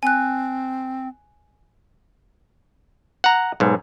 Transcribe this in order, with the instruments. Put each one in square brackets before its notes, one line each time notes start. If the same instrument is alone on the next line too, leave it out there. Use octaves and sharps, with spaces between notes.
[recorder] C4 [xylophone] G#5 F#6
[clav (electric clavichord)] F#5 A#5
B1 G#2